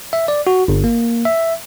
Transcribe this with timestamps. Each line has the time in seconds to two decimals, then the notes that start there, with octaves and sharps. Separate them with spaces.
0.13 E5
0.28 D5
0.47 F#4
0.68 G1
0.84 A#3
1.25 E5